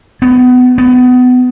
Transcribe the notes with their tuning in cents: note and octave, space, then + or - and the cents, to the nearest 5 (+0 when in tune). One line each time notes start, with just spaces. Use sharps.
B3 +20
B3 +25